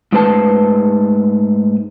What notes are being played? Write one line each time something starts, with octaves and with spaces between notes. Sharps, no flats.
G#2 A3 D#4 B4 C5 A5